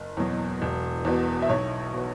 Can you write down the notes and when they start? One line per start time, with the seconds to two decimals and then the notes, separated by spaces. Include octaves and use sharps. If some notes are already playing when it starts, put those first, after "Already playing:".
Already playing: F#1
0.17 E2 B2 F#3
0.62 E1
1.05 E2 B2 B3
1.42 E5
1.49 B1 C#5
1.93 B2 B3